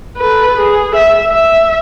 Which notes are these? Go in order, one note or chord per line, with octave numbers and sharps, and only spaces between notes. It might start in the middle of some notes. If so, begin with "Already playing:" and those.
A4 B4
G#4
E5
E5